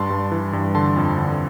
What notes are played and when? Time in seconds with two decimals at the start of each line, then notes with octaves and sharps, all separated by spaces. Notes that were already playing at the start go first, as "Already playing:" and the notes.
Already playing: G2 A5 C6
0.10 G2
0.32 E3
0.53 G2
0.75 D3 A5 C6
0.96 F2
1.18 D3